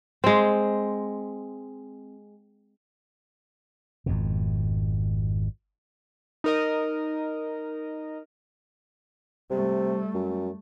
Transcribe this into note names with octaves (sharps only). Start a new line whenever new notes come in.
G#3 C4
G#1 F2 B2
D#4 A#4 D#5
C3 G3 A3
F#2